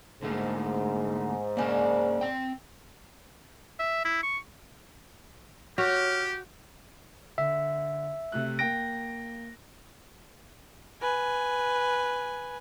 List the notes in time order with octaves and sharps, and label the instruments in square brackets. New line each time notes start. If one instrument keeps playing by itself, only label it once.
[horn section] G#2 [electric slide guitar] D3 A3 A#3
[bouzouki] C#3 D4 [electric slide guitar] A#3 C#4 A#4
[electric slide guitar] C4 G5
[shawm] E5
E4
C#6
[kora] F#4 [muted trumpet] G4 [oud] C#5 [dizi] F6
[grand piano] D3 [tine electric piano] E5
[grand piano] C3 A3 F#6
[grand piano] A#3 G5 D7 [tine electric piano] A#6
[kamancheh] B4 G#5